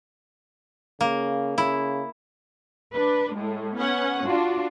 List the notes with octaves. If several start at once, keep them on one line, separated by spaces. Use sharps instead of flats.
C#3 A#3
C#3 E4
D4 B4
A2 G#3
B3 C#4 F#5
D4 F4 F#4